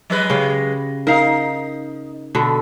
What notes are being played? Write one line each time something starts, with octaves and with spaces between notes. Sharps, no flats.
F#3 G#3 B4
C#3 G4
D#4 A#4 F5
B2 D3 A4